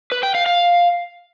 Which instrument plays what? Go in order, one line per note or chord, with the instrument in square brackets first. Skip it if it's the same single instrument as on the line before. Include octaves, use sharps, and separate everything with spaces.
[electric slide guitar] B4
G5
F5
F5